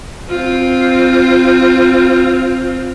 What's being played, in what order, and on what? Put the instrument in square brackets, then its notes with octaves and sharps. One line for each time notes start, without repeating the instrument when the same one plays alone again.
[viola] C4 F4